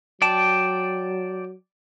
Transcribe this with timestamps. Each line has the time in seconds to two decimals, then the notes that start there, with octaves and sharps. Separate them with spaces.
0.22 F#3 D5 G5 A5